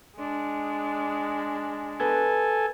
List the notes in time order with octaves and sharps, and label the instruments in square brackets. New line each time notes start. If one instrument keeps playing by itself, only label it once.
[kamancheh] G#3 D4
[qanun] B3 B4 D#5 [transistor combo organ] A4 G#5